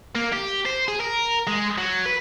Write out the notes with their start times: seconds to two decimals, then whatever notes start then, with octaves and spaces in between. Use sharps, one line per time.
0.15 A#3
0.33 G4
0.66 C5
0.88 G#4
1.00 A#4
1.47 G#3
1.78 F#3
2.05 B4